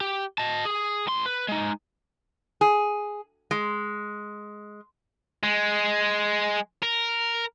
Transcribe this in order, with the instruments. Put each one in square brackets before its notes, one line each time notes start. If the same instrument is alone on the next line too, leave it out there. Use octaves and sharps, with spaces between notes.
[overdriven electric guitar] G4
D#5 A5
G#4
A2 C6
B4
G#3 D#4
[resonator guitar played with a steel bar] G#4
G#3
[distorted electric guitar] G#3
A#4